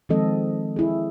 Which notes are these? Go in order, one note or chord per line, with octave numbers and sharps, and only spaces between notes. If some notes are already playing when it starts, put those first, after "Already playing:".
D#3 F3 G#3 C4 A4 D#5
E4 G#4